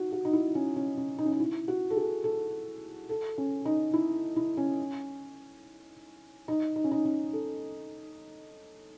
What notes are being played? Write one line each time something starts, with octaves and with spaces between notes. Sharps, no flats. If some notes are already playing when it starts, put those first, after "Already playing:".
Already playing: D#4 F#4
F#4
D#4
E4
C#4
C#4
C#4
D#4
C#4
D#4
E4
F#4
A4
G#4
A4
A4
C#4
D#4
E4
E4
C#4
D#4
D#4
C#4
D#4
C#4
A4